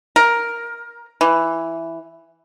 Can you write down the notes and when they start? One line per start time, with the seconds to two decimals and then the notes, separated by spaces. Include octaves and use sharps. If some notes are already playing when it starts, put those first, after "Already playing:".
0.16 A#4
1.21 E3